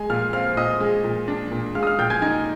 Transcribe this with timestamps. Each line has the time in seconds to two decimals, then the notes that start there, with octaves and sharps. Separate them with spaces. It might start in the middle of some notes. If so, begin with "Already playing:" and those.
Already playing: G#3 G#5
0.10 A#2 F5 F6
0.33 C4 F5 F6
0.57 A#2 D#5 D#6
0.80 G#3
1.04 A#2
1.28 D4
1.51 A#2
1.75 G#3 F5 F6
1.83 D#6
1.87 F5 F6
1.98 A#2 G5 G6
2.10 G#5 G#6
2.22 D#4 G#5 G#6